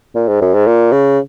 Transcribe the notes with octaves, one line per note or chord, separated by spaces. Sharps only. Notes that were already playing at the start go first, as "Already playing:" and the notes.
A#2
G#2
F#2
G#2
A#2
C#3